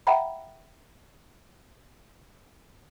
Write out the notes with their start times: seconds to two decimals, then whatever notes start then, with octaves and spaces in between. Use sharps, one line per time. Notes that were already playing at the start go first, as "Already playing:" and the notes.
0.07 E5 F#5 G5 A#5 B5